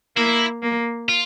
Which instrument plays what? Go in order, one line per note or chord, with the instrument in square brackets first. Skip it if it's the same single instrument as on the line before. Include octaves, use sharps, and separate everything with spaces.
[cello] A#3 [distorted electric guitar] E4
[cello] A#3
[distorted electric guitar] F4